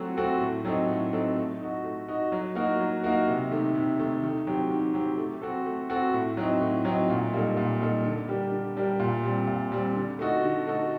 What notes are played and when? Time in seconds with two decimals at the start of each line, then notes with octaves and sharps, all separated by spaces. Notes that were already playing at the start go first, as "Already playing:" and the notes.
Already playing: F#3 A3 C4 F#4 A4
0.17 A3 C4 F#4 A4
0.41 A2
0.65 F#3 C4 D#4 A4
0.89 A2
1.13 F#3 C4 D#4 A4
1.36 A3
1.60 D#4 F#4
1.84 A3
2.08 D#4 F#4
2.32 F#3
2.55 A#3 D#4 F#4 A#4
2.80 F#3
3.03 A#3 D#4 F#4 A#4
3.28 C3
3.51 D#3 A3
3.75 C3
3.99 D#3 A3
4.23 D#3
4.47 F#3 C4 G4
4.70 D#3
4.94 F#3 C4 G4
5.18 A3
5.42 C4 F#4 A4
5.66 A3
5.90 C4 F#4 A4
6.14 A2
6.37 F#3 C4 D#4
6.61 A2
6.85 F#3 C4 D#4
7.09 A#2
7.33 G3 A#3 D#4 A4
7.57 A#2
7.80 G3 A#3 D#4 A4
8.05 D3
8.28 G3 D4 G4 A#4
8.52 D3
8.77 G3 D4 G4 A#4
9.00 A#2
9.23 G3 C4
9.47 A#2
9.72 G3 C4
9.96 D3
10.19 A3 D#4 F#4 A4
10.44 D3
10.67 A3 D#4 F#4 A4